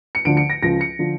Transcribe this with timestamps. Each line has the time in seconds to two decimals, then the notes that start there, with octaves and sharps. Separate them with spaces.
0.15 C#7
0.25 D2 D3 F3 D7
0.37 C#7
0.50 A#6
0.62 C#2 C#3 F3 A#6
0.81 C#7
0.99 D3 F3